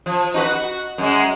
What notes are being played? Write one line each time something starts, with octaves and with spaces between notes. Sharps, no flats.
F3
D#4 F#4 B4
F#4
F#2 G#3